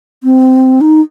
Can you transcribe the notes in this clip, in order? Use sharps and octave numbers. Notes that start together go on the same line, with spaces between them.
C4
D#4